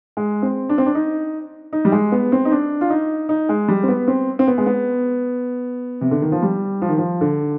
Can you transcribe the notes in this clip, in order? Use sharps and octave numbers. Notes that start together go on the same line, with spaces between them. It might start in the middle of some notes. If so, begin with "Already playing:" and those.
G#3
C4
D4
C4
D4
D#4
D#4
G3
G#3
B3
C4
D#4
D4
F4
D#4
D#4
G#3
G3
C4
B3
C4
C4
B3
G#3
B3
C3
D3
D#3
F3
G3
F3
D#3
F3
D3